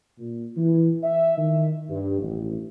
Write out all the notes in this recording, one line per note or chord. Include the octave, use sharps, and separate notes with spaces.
A#2
E3
E5
D#3
G2
A1